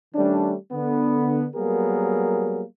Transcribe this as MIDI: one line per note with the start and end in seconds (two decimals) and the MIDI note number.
0.15 0.54 51
0.15 0.54 55
0.15 0.54 57
0.15 0.54 61
0.15 0.54 62
0.72 1.46 50
0.72 1.46 59
1.56 2.62 54
1.56 2.62 55
1.56 2.62 58
1.56 2.62 59
1.56 2.62 68
1.56 2.62 70